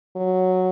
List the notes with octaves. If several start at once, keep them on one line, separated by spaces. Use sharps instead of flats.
F#3